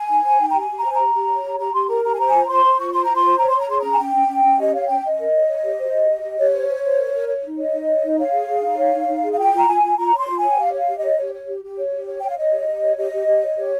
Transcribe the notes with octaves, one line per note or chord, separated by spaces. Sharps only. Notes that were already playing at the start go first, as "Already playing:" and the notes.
Already playing: G#5
D#4
C5
D#4 G5
G4 A#5
G#5
G4
A#5
C5 G#5
G4 A#5
G4
C#5
G4
G4 A#5
G4 C6
A#4 A#5
G4 A#5
G#5
C5 A#5
F4 G#5
A#5
C5 C6
C5
F4 C#6
C5 C6
A#5
F4
C6
C5
C#5 A#5
C6
C#5 A#5
G#4 C6
C#4 A#5
G#5
C#4 G5
C#4
C#4
C#4
G4 D#5
C#5 F5
C#4 G5
C#4 D#5
A#4
C#5
C#5
G4
C5
G4
G4
G4
G4 C#5
C5
C5
C5
A#4
A#4
C#5
D#4
C#5 D#5
D#4
C#5
D#4
C#5 F5
G#4
G#4
D#4
C#5
D#4
D#4
G#4
F5
F4 G5
F4 A#5
F4 G#5
F4
F4 A#5
C#5 C6
F4
C#5 G#5
G5
G4 F5
C#5
F5
G4
C#5 D#5
G4 C#5
C#5
G4
G4
C#5
G4
C#5
C#5 G5
F5
C#5 D#5
G4
G4
C#5
G4 D#5
G4
G4
C#5
G4 C#5